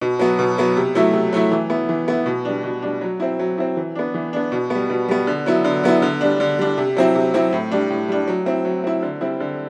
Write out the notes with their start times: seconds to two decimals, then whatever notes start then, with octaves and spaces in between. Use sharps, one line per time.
0.01 B2
0.19 F#3 B3
0.39 B2
0.58 F#3 B3
0.77 C3
0.95 F#3 A3 E4
1.13 C3
1.33 F#3 A3 E4
1.52 E3
1.70 B3 E4
1.89 E3
2.08 B3 E4
2.26 B2
2.45 G3 D4
2.64 B2
2.82 G3 D4
3.01 F#3
3.20 C4 E4
3.39 F#3
3.58 C4 E4
3.77 E3
3.95 B3 D4
4.14 E3
4.33 B3 D4
4.52 B2
4.70 G3 B3
4.90 B2
5.08 G3 B3
5.27 D3
5.46 F#3 B3 E4
5.64 D3
5.84 F#3 B3 E4
6.02 D3
6.21 G3 D4
6.40 D3
6.59 G3 D4
6.78 C3
6.97 F#3 C4 E4
7.15 C3
7.34 F#3 C4 E4
7.52 A2
7.71 G3 D4
7.90 A2
8.09 G3 D4
8.27 F#3
8.46 C4 E4
8.65 F#3
8.84 C4 E4
9.03 D3
9.21 G3 C4 E4
9.40 D3